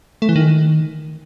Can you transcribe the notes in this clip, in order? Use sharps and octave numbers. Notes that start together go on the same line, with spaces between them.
A3
E3
D#3